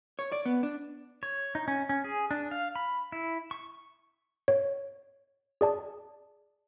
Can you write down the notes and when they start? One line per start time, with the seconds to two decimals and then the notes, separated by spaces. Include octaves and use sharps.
0.19 C#5
0.32 D5
0.46 B3
0.63 D4
1.23 C#5
1.55 D#4
1.68 C#4
1.89 C#4
2.05 G#4
2.31 D4
2.51 F5
2.76 B5
3.12 E4
3.51 C#6
4.48 C#5
5.61 G#4 D5 A5